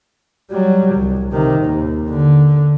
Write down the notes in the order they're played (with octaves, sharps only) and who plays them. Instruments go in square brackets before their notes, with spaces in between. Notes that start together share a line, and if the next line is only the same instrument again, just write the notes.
[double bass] F#3 G3
C2
C3 D#3
D#2
D3